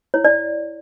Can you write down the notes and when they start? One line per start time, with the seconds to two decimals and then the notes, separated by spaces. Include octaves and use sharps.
0.14 E4 C#5
0.25 D5